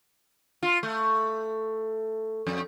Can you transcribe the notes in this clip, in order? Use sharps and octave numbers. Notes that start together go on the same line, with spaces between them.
F4
A3
F2